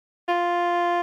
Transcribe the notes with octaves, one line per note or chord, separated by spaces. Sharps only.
F4